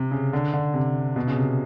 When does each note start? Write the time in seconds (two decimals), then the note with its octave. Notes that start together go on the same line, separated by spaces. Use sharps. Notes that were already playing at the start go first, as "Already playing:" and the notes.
Already playing: C3
0.11 C#3
0.33 D3
0.53 D3
0.74 C3
1.16 B2
1.27 C#3
1.37 C3